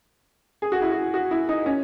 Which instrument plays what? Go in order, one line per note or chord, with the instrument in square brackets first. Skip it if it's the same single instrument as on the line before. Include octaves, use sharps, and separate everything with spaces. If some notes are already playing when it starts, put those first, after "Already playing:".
[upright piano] G#4
F#4
E4
F#4
F#4
E4
D#4
C#4